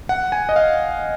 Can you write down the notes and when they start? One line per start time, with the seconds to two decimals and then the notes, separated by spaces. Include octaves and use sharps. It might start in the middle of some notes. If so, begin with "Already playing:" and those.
0.09 F#5
0.32 G#5
0.49 D#5
0.56 F5